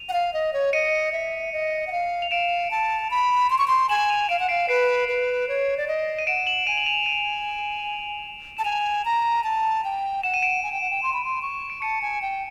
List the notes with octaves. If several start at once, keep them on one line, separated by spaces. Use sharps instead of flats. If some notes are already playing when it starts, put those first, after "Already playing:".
Already playing: D#7 F7
F#5
F5
D#5
C#5
D#5 C#7 D#7
E5
D#5
F#5
F5
F7
F5 D7 E7
A5
B5
C6
C#6
C6
G#5 E7 F#7
D#7 F7
F5 D7 E7
F#5
F5 C7 D7
B4 C7 D7
B4
C#5
D5
D#5
D#7
F#5 D7 E7
E7 F#7
G#5 D#7 F7
F#7
D#7 F7
D#7 F7
A5 E7
G#5 D#7 F7
A#5
A5
G5
F#5 E7
D#7
D7 E7
G#5
G5
F#5
G5
C6
B5
C6
C#6
D7
A5 C#7 D#7
G#5
G5